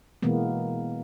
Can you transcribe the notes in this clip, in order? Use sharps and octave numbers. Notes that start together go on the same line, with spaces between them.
B2 E3 G#3 A#3 B3